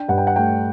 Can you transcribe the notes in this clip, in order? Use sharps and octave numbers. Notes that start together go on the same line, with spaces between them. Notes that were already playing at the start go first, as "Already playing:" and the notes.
Already playing: D4 G5
G2 F#5
G5
F#5
A3 G5